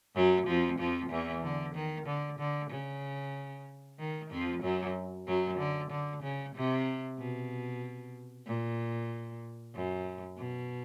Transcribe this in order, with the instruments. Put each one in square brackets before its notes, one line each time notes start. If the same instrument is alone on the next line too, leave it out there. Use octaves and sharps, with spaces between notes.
[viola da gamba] F#2 F#3
F2 F3
F2 F3
E2 E3
D3
D#3
D3
D3
C#3
D#3
F2 F3
F#2 F#3
F#2 F#3
D3
D3
C#3
C3
B2
A#2
F#2
B2